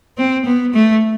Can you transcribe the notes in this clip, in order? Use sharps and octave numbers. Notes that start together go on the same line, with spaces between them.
C4
B3
A3